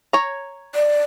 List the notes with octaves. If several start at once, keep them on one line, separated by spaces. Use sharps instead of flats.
C#5 A#5
D5